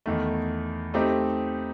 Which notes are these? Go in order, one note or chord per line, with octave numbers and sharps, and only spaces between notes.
E2 D#3 A3
A3 C4 D#4 G4